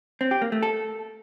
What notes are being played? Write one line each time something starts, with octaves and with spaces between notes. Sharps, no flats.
C4
G4
A#3
A3
A4